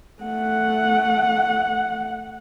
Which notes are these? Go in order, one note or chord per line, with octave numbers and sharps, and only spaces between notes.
A3 F#5